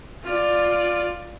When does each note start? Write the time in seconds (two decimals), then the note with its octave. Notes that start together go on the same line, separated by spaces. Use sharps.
0.23 F4 D5